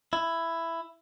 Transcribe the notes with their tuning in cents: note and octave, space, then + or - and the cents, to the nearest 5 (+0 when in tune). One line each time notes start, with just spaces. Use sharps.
E4 +10